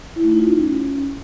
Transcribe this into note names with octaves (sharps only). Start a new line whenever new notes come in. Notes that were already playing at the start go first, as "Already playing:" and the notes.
E4
A3
D#4
F4
C#4